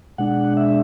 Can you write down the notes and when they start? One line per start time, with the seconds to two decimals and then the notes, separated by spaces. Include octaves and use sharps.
0.18 B2 G#3 D4 F#5
0.57 E5